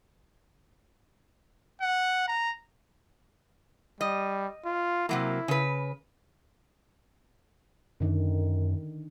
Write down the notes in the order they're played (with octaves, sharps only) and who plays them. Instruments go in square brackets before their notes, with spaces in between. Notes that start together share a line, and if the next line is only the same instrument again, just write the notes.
[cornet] F#5
A#5
[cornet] G3 [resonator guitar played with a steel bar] D#5
[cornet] F4
[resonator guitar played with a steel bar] C3 F#3 A#3 [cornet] E4
[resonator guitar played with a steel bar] C#3 B4
[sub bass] F#2 [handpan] D3 D#3